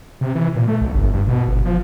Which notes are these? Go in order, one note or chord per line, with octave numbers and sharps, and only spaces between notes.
C3
E3
A#2
A3
B1
G1
G2
B2
G1
F3